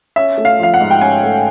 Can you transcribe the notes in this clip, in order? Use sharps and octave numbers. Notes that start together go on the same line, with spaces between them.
C#4 E5
A3
F5
F3 F5
F#5
G#2
G5
C#4 G#5
A3